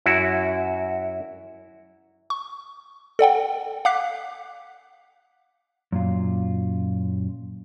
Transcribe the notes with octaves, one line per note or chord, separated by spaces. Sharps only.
F#2 E4 F#4
C#6
A4 D5 F#5 G5
F5 F#5 D6 F#6 B6 C7
F#2 A#2 F4